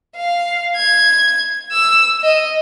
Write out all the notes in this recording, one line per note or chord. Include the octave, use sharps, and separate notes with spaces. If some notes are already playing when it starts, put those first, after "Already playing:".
F5
G#6
E6
D#5